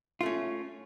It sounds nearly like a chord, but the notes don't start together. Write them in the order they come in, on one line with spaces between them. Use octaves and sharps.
F4 A3 C#4